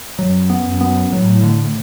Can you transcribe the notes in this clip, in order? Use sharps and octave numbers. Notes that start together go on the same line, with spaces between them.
F#2 F#3
B3
F#2
B3
A2 F#3
D3